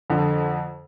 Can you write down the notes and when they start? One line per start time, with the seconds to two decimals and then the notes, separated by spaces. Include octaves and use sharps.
0.10 F2 D3